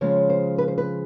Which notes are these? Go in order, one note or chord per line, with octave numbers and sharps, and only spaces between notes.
C#3 F3 G#3 C#5
C5
B4
C5
B4